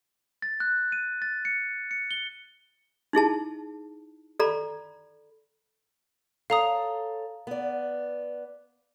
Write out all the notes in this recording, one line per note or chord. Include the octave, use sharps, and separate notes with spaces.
A6
F#6
D#7
A6
C#7
C#7
G7
D#4 E4 G#4 A5
A4 D5 A#5 B5
A4 C#5 F5 A#5 D#6
B3 D5